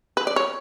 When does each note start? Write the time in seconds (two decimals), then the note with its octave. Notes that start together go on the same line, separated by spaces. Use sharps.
0.17 B4
0.27 D5
0.36 C#5